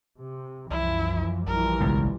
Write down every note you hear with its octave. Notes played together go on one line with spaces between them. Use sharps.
C3
C2 F#2 E3 F3 E4
A#1 E3 F3 G3 A#4
C#2 G2 B2